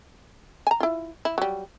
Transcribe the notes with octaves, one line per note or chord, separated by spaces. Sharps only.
G#5 A#5
E4 F4
E4
F#3 G3